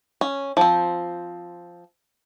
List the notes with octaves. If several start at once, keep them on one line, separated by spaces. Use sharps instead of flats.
C#4
F3 C4